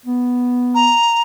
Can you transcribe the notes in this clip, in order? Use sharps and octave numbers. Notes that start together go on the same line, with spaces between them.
B3
A#5